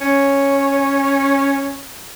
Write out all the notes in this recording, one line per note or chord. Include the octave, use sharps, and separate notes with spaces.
C#4 C#5